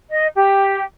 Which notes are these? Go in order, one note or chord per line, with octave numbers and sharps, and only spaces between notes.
D#5
G4